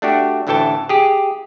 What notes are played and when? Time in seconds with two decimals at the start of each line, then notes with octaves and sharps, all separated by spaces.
0.02 A3 D4 F#4 G4
0.47 A1 D2 E3 A4 G5 A5
0.89 G4 G#4